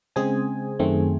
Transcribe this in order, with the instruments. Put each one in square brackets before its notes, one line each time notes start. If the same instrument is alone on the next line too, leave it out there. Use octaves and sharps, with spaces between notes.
[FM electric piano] C#3 G#3 C4 G#4 G#5
F#2 D#3 A3 C4